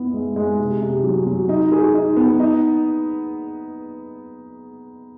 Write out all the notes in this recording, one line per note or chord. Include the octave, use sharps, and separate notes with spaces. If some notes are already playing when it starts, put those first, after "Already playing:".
Already playing: B3 E4
G#3
G#3
C3
C3
F#3
F#3
D#4
G#4
D#4
B3
D#4